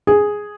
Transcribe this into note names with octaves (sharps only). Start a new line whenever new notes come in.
G#4